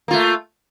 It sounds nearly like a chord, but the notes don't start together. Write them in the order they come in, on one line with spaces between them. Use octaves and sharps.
A#3 F4 A3